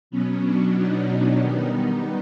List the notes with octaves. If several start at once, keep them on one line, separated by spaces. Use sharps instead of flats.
B2 F#3 B3 C#4
D4
D#4
D#3 G3 B3